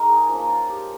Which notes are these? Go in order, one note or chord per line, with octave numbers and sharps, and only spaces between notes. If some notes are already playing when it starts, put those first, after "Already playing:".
Already playing: G#3 D#4 A#4 D#5 F5
G#4
F3 A#3 C#4 F4
F4
G4